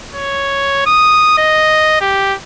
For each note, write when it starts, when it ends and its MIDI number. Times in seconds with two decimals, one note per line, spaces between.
0.14 0.83 73
0.86 1.35 87
1.38 2.00 75
2.01 2.35 67